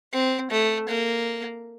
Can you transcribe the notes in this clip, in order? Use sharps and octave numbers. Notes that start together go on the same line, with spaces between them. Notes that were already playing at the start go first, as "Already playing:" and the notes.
C4
A3
A#3